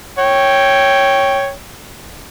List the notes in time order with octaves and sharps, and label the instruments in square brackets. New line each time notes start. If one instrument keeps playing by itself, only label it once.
[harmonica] C#5 G5